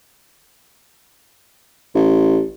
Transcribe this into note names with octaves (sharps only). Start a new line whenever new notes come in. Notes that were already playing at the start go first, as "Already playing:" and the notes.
A1